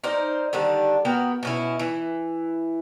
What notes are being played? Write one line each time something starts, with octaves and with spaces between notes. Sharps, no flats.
D#4 A#4 C5 D5
D3 D#3 G3 D4
B3 F#4 A#4 G5
B2 C#4 E4
E3